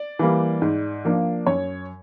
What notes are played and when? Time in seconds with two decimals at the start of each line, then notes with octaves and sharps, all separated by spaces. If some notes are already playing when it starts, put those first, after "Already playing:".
Already playing: D5
0.19 E3 G3 A#3
0.62 G#2
1.05 F3 A#3 D4
1.46 F#2 C#5